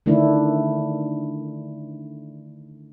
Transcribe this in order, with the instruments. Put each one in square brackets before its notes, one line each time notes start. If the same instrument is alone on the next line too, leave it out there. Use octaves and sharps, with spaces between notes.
[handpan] D3 D#3 A3 D4 E4